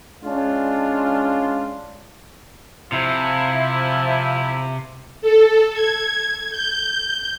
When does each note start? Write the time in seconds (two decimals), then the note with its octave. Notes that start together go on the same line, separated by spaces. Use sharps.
0.24 G#3 C#4 D4 F4
2.92 C3 F3 E4
5.22 A4
5.73 G#6
6.50 G6